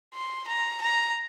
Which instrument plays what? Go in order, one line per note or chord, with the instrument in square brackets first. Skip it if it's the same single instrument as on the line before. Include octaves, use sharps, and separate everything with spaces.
[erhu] C6
A#5
A#5